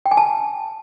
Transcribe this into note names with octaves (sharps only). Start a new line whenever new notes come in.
G5
G#5
A5